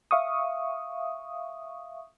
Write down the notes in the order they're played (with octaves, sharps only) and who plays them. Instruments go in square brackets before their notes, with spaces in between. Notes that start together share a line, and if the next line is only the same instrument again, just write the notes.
[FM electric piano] E5 F5 C#6 D#6